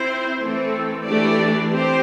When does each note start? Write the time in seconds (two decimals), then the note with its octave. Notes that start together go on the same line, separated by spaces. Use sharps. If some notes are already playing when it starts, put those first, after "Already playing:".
Already playing: C4 E4 C5
0.41 E3 A3 C4 A4
1.06 E3 A3 D4 G4 D5
1.72 C4 G4 C5